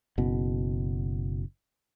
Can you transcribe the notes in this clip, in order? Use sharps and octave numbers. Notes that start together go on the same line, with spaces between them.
F#1 B2